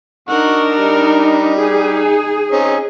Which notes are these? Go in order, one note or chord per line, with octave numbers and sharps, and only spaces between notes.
D4 D#4 A#4 F#5 C#6
G3
D#4 G#4
C4 C#4 D#4